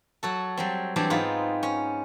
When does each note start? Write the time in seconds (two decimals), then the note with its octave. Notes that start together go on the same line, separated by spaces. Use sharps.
0.23 F#3 F#4 A4
0.57 F#3 G3 C4
0.96 E3 F#3 G3 C4 D4
1.10 G#2 B3 C4 D#4 F4
1.63 C#4